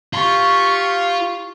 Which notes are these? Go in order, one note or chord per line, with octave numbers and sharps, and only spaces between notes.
F4 G4 C#6